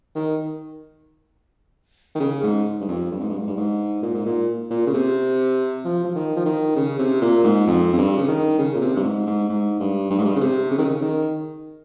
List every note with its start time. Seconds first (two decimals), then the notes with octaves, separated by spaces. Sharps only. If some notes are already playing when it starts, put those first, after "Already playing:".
0.15 D#3
2.15 D#3
2.20 C#3
2.43 G#2
2.81 G2
2.89 F2
3.11 G2
3.21 G#2
3.29 G2
3.38 G#2
3.47 G2
3.57 G#2
4.03 A#2
4.14 G#2
4.26 A#2
4.71 A#2
4.87 C#3
4.94 C3
5.85 F3
6.04 F3
6.15 D#3
6.36 F3
6.46 D#3
6.76 C#3
6.99 C3
7.21 A#2
7.44 G#2
7.67 F2
7.93 F2
7.98 G2
8.18 C#3
8.28 D#3
8.58 C#3
8.74 A#2
8.81 C3
8.97 G2
9.04 G#2
9.27 G#2
9.49 G#2
9.80 G2
10.10 G2
10.18 G#2
10.25 G2
10.36 C#3
10.41 C3
10.71 C#3
10.78 D#3
10.85 C#3
11.02 D#3